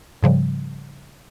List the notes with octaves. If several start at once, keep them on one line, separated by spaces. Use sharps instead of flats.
G#2 C#3 F3 G3